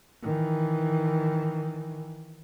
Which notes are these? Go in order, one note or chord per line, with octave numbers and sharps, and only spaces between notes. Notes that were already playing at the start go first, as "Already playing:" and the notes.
D#3 E3